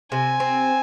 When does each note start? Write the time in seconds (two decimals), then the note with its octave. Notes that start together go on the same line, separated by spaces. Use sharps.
0.12 C3 G#5
0.40 C4